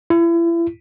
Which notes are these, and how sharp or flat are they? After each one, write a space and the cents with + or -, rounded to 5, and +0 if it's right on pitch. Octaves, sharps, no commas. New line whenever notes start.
E4 +35